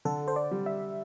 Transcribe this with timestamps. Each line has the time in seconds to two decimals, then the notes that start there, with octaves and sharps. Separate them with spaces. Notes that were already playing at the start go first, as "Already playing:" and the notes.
0.05 D3 A4
0.28 C5
0.36 D5
0.51 G3
0.66 E5